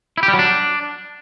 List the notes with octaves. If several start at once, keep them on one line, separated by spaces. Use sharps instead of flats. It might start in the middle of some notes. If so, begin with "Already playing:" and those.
E4
G4
G3
F#3
D4